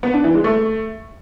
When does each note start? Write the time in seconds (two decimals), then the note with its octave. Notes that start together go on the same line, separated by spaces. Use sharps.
0.03 B3
0.13 D4
0.24 E3
0.34 G#3
0.44 A3